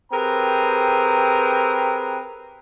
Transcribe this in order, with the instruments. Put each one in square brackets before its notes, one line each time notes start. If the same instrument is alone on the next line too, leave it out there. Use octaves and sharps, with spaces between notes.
[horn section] C4 G4 G#4 A#4 B4 A#5